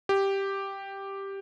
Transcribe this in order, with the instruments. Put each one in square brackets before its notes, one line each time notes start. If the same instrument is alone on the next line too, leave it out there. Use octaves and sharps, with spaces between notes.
[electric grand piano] G4